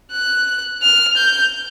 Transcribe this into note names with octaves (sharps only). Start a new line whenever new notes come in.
F#6
F6
G6